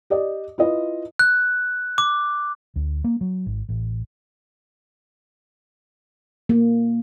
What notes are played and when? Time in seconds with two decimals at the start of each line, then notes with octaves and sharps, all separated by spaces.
0.10 G4 D5 D#5
0.58 E4 F4 B4 D#5
1.19 F#6
1.98 D6
2.76 D2
3.04 A#3
3.21 F#3
3.46 G#1
3.69 A1
6.49 A#3